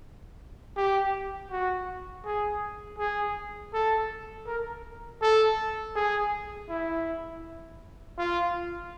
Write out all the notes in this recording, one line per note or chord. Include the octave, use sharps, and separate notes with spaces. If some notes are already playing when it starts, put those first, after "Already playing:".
G4
F#4
G#4
G#4
A4
A#4
A4
G#4
E4
F4